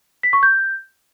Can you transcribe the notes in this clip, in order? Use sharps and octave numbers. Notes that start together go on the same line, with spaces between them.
B6
C#6
G6